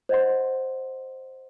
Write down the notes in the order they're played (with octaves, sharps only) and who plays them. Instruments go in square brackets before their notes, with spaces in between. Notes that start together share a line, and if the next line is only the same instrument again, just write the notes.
[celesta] C5 D#5 F#5 C6